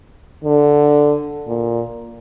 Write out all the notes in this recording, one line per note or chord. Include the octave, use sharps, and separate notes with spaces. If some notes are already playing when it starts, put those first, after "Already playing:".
D3
A#2